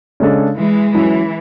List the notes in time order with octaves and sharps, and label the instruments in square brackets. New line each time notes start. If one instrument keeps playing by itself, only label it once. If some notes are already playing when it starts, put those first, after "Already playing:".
[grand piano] C#3 G#3 D4 A4
[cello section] E3 G#3
[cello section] E3 [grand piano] F#3 C#4 E4